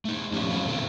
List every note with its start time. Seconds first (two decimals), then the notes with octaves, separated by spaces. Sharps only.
0.05 A3 D#4
0.33 F3 C#4 D4 F4 G4
0.48 F#2 F#3 C#4 F4
0.66 B2 D3 A3 B3 C4